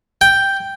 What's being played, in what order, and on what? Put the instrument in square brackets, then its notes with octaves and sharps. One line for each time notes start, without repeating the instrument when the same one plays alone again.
[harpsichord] G5